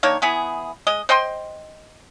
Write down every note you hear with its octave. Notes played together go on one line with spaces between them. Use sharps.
D#3 A#3 D4 C#5
E3 B3 G#4
G#3 D#5
C5 D#5 G5 C6